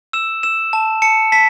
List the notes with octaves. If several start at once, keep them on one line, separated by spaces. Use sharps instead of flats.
E6 E7
E6 E7
A5
A5 C#7
A5 B6